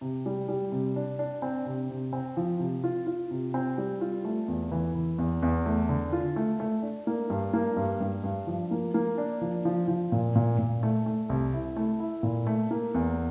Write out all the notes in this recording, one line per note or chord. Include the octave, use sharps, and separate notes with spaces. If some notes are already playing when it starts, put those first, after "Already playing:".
C3
G3
G3
C3
D4
D4
C4
C3
C3
C4
F3
C3
F4
F4
C3
C4
G3
F4
A3
E2
E3
E3
E2
E2
A3
D3
F4
A3
A3
D4
A#3
G2
A#3
G2
G2
G2
F3
A#3
A#3
D4
F3
F3
F3
A#2
A#2
A#2
A3
A3
C2
E4
A3
E4
A#2
A3
A#3
E2